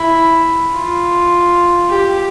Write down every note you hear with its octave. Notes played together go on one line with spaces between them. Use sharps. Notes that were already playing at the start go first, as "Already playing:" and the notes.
Already playing: E4
F4
G4